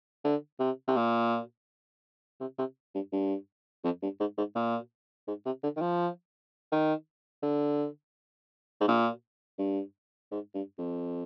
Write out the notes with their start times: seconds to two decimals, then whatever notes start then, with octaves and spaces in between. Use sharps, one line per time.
0.25 D3
0.60 C3
0.88 C3
0.96 A#2
2.40 C3
2.59 C3
2.94 G2
3.12 G2
3.84 F2
4.02 G2
4.20 G#2
4.38 G#2
4.55 A#2
5.28 G#2
5.46 C3
5.63 D3
5.76 D#3
5.81 F3
6.72 D#3
7.43 D3
8.81 G#2
8.88 A#2
9.58 G2
10.32 G#2
10.54 G2
10.78 F2